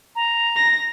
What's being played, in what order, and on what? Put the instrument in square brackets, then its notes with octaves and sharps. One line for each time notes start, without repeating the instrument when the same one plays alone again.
[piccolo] A#5
[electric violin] A#6